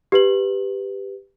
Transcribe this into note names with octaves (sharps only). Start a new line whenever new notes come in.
G4 B4 F#7